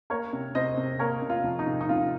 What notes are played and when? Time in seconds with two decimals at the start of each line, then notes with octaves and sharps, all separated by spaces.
0.10 A#3 A#4 C#5
0.33 C3
0.55 C3 C5 D#5
0.77 C3
0.99 A#3 A#4 C#5
1.22 C3
1.30 F4
1.44 F3
1.59 D#4
1.67 C3
1.81 D#4
1.89 C3 F4